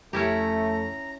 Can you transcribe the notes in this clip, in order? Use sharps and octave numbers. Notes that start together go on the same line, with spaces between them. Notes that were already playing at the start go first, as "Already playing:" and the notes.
F2 A3 C#4 E4 G4 A#5